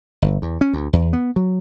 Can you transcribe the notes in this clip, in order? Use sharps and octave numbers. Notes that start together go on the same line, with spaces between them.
G1
E2
C#4
D2
E2
B3
F#3